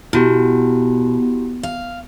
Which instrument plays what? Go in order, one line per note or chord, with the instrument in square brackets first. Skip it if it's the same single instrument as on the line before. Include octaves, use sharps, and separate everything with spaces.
[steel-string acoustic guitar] B2 [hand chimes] E4 F#4 G4
[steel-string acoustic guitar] F5